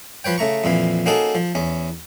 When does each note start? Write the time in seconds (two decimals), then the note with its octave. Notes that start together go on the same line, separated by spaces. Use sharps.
0.24 F3 B4 C#5 G5
0.38 C#3 A3 A#5 C#6
0.64 F2 A#2 E3 F5
1.06 A#3 C#4 D#4 F#4 G#4 A4
1.35 F3
1.55 E2 C#4